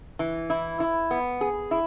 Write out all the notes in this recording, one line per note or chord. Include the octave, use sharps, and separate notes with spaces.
E3
E4
E4
B3
G#4
E4